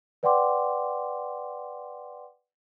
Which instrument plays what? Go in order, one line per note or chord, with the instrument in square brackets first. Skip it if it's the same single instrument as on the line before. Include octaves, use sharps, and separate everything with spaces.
[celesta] B4 D5 F#5 G5 C6 D6